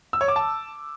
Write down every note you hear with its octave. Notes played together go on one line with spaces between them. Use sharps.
E6
C#5
D6
A5